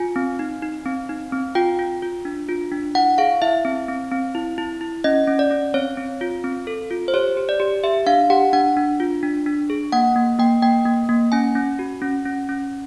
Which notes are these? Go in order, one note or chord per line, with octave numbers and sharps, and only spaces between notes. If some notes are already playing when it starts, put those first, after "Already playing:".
Already playing: F4 G#5
C4
D#4
D#4
C4
D#4
C4
F4 G5
F4
F4
D4
F4
D4
E4 F#5
G#4 F5
E4 E5
C4
C4
C4
E4
E4
E4
C#4 D#5
C#4
D5
C#4
C4 C#5
C4
F4
C4
A4
F4
C5
G4 C#5
G4
D5
G4
G4 E5
D4 F5
G4 F#5
D4 F#5
D4
F4
D4
D4
G#4
A#3 F#5
A#3
A#3 G5
A#3 G5
A#3
A#3
C#4 G#5
C#4
F#4
C#4
C#4
C#4